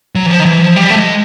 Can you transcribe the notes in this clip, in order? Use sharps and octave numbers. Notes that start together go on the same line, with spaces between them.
F#3
E3
F3
D#3
E3
F3
G3
A3
G#3